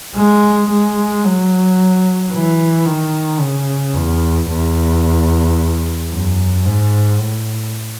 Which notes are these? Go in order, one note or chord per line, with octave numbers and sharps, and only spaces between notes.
G#3
G#3
F#3
E3
D#3
C#3
E2
E2
F#2
G#2
A2